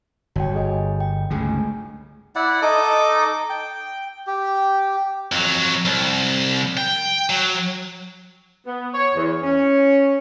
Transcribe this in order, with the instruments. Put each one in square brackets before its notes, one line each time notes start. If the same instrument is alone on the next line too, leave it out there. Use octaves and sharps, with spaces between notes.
[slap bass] G1 [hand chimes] F#4 C#5 G5
[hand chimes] G#4 D#5 G#5
G5
[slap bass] C#2 G2 D3 [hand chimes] A3 G#4 G#5
[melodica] E4 D5 F#5
D#4 A4 D#5 D6
G5
G4
[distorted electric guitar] F2 F#3
C2
G5
F#3
[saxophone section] B3
C#5
E2
C#4